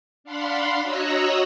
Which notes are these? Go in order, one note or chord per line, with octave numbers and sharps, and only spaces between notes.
D4 F5 F#5 B5 C6
F#4 C#5 D#5 A#5 E6 F#6